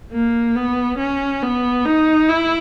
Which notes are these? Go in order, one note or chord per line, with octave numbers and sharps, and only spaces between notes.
A#3
B3
C#4
B3
D#4
E4